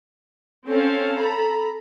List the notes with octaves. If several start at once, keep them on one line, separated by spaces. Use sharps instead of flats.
C4 C#4 A4 F5
A#5 B5